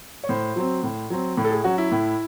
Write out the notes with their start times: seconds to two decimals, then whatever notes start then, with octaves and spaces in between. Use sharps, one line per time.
0.24 C#5
0.29 A2 C5
0.56 F#3 C4
0.83 A2
1.10 F#3 C4
1.37 A2
1.44 A4
1.51 G#4
1.64 F#3 C#4 F#4
1.78 E4
1.92 A2